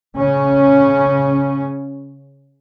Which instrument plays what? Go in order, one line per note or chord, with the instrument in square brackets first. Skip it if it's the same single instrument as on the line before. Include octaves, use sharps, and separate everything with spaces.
[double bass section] C#3 C#4